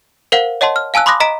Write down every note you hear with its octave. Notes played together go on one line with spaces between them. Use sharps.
A#4 C5 F5 F#5
C#5 D#5 F#5 A5 C6
F6
F5 G#5 A5 E6 F#6
B5 C6 D6 D#6 F#6 A#6
D#5 A#5 B6 D7